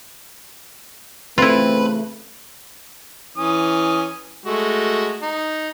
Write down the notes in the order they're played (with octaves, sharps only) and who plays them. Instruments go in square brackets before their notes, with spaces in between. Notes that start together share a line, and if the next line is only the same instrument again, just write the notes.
[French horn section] C#3 E3 A3 [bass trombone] C4 [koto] E4 F4 [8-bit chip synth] B4
[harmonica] E3 C#4 D#6
G#3 A3 F#4
D#4